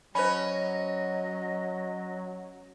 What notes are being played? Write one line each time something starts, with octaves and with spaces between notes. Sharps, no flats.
F#3 C#4 C5 D#5 B5